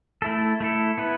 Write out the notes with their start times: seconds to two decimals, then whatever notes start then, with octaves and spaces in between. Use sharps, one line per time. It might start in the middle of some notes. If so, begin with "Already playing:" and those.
0.22 A3 E4 A4
0.60 A3 E4 A4
0.98 B3 E4 B4